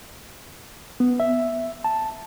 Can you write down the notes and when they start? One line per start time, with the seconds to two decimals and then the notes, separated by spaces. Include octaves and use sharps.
1.00 B3
1.20 E5
1.84 A5